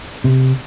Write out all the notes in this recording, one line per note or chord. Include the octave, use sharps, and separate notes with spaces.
C3